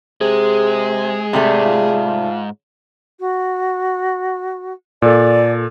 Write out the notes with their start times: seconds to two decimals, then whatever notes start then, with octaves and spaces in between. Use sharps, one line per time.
0.21 C3 G#3 G#4
1.33 G#2 C3 G3 A3
1.66 F4
3.20 F#4
5.02 A#2 A4 D5